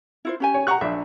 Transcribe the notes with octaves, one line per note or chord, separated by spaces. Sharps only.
E4 F4 C5
C#4 G4 G#5
C#5
G4 F#5 A#5 C#6 F#6
A#1 D4 E5